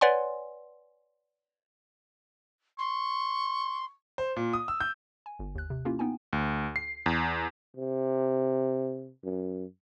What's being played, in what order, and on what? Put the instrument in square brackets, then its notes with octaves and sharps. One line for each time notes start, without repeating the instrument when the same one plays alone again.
[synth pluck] B4 C#5 D5 F#5 G#5 C6
[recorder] C6 [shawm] C#6
[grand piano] C5
A#2
D#6
E6
G6
[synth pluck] G#5
G1
D#2 F#6
C3
A#3 C#4 E4 F4 G4
B3 D#4 G5 G#5
[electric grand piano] D2
C7
E2
[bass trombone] C3
F#2